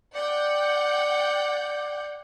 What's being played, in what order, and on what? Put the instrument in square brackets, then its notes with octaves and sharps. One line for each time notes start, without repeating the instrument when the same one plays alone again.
[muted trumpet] D5 [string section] F#5 G5 G6